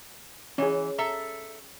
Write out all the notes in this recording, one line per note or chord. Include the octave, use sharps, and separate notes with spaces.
E3 C#4 G#4
A4 E5 A#5